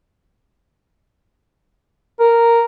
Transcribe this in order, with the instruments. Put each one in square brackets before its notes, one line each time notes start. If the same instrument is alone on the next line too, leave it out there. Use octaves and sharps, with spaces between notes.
[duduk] A#4